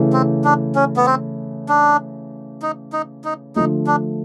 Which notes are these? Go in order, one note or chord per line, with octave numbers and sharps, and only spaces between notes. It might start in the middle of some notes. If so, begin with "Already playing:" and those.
Already playing: C#3 E3 A3
C4
D4
C#4
B3
C4
D4
D#4
D#4
D#4
D3 F3 A3 D#4
D4